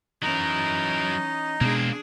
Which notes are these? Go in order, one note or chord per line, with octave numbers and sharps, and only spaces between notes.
E3 F#3 C#4 D#4 A#4 D#5
B2 G#3 A#3 C4 D4 G#4